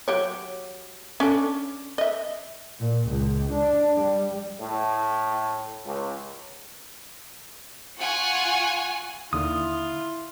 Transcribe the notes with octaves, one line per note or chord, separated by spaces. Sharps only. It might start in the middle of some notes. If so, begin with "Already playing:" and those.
F#3 G4 C#5
C#4 D4 A4
D#5 E5
A#2
C#2
D4
G3
A2
C#2
F4 F#5 G#5 C#6
D#2 D3 E4 F4 D#6